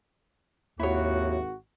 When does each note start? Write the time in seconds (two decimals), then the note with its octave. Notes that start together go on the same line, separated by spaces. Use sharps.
0.79 G#1 D#2 E4 F#4 C#5